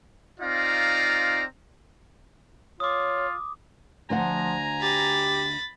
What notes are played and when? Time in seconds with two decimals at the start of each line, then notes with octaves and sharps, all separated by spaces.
0.41 C4 D#4 F4 D5 F5 A#5
2.80 F4 C#5 D6 D#6
4.10 D2 F3 C5 F#5 G#5 A#5
4.82 G4 B5 A6